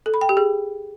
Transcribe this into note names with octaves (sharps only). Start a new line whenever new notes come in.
A4
B5
G5
G4
G#4